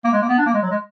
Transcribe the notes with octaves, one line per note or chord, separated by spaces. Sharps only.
A#3
G#3
A#3
B3
D4
A#3
G#3
F#3
G#3